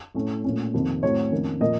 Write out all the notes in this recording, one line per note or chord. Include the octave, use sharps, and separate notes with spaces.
A2 A3 C#4
A#2 A3 C#4
F2 C3 D#3 A#3
A2 F#3 A3 C4 C#5
F2 D#3 A#3 C#4
A#2 F3 A#3 D#5